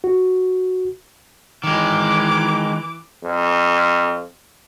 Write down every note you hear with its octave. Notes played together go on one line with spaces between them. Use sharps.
F#4
D#3 E3 G#3 D6
F2